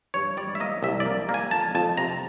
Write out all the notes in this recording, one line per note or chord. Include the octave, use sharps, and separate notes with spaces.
G2 C#5
G3 D5
E5
A#3 D#5
C2 E5
D5
A#3
A#3
G#5
F2 A5
F2 A5
C3 A#5